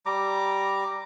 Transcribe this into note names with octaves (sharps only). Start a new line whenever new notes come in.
G3 A#5 D6